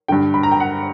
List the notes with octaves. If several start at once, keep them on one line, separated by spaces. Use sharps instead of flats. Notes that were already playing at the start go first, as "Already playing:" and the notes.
G2 D3 G5
B5
A#5
G5
F#5